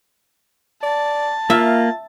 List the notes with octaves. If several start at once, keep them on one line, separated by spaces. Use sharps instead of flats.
D5 A5
A#3 F4 E5